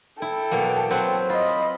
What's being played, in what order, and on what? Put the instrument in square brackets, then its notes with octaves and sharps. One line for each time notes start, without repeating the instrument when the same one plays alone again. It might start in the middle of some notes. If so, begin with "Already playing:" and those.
[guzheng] E4 [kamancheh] A4 G5
[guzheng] B2 F#3 A#3
F#3 C4 B4
[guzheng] F4 [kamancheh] D#5 B5